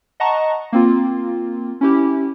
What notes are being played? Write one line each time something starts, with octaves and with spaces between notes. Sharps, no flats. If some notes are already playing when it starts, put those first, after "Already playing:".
D#5 F#5 A5 A#5 C#6
A#3 C4 F4
C#4 E4 G4